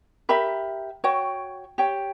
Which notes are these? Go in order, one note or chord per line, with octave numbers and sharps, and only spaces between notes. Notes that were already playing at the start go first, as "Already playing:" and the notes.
G4 A#4 E5 B5
F#4 C#5 G5
G4 C#5 G5